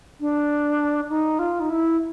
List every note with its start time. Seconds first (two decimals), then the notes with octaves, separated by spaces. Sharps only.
0.20 D4
1.09 D#4
1.39 F4
1.60 D#4
1.70 E4